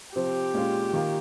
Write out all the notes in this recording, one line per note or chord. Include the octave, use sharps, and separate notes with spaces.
C3 F3 C4 G4
A#2 G#3 C#4 F4
D#3 A#3 F4